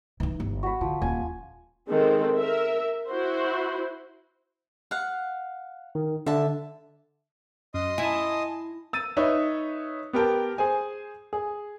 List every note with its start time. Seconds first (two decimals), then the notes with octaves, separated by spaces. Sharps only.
0.20 E3 D#4
0.40 G1
0.63 F#4 B5
0.81 D3 F3
1.02 D#1 G#5
1.89 D#3 G#3 C4 A4
2.39 A#4 E5
3.07 E4 F#4 C5
4.91 F5 F#5
5.95 D#3
6.26 D3 E5 A5
7.74 F#2 D#5 C6 D#6
7.98 E4 G#5 A5
8.93 E6 A6 D#7
9.17 D#4 B4 C#5 E5
10.13 B3 G4 A#4 G5 A5
10.58 G#4 C5 G#5
11.33 G#4